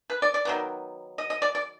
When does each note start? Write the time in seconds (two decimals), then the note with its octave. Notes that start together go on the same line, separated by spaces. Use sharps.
0.10 B4
0.22 D5
0.34 D5
0.45 D#3 F#3 B3
1.18 D#5
1.30 D#5
1.42 D5
1.55 D5